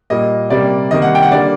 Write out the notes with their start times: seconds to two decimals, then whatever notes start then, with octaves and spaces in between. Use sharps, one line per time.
0.10 A#2 G3 A#3 D#5
0.50 C3 G3 A#3 D5
0.91 C3 D#3 G3 A#3 D#5
1.02 F#5
1.15 G5
1.22 F#5
1.32 D3 G3 A#3 D5